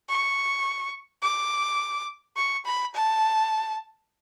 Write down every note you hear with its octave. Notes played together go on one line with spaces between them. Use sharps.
C#6
D6
C#6
B5
A5